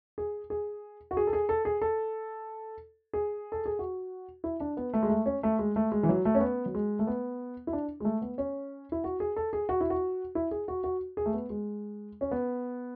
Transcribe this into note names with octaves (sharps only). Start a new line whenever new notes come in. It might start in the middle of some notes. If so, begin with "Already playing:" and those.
G#4
G#4
F#4
G#4
A4
G#4
A4
G#4
A4
G#4
A4
G#4
F#4
E4
D4
B3
A3
G#3
A3
C#4
A3
G#3
A3
G#3
E3
F#3
A3
C#4
B3
F#3
G#3
A3
B3
E4
D4
G#3
A3
B3
C#4
E4
F#4
G#4
A4
G#4
F#4
E4
F#4
E4
G#4
F#4
F#4
G#4
A3
B3
G#3
C#4
B3